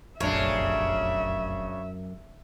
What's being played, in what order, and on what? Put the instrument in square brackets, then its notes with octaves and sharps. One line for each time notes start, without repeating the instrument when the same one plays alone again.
[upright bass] F1 A#1 [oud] F#2 [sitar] C#3 D4 C#5 [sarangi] E5